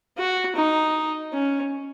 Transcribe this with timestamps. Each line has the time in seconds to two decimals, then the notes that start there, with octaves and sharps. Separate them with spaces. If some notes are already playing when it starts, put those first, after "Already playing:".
0.18 F#4
0.55 D#4
1.33 C#4